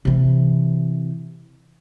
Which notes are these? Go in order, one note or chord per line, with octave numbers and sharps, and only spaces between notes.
C3 E3